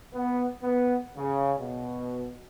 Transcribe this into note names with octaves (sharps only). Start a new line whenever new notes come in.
B3
B3
C#3
B2